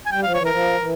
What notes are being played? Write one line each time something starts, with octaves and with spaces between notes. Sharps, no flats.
G#5
G3 G5
F3 F5
E3 C#5
F3 A#4
E3